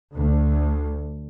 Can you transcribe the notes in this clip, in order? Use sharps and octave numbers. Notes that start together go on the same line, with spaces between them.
D2